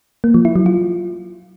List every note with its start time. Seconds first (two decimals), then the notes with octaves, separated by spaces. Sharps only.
0.24 A#3
0.34 F3
0.45 E4
0.56 F#3
0.66 F4